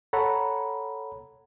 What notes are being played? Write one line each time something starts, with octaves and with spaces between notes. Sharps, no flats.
A4 C#5 F#5 A#5 B5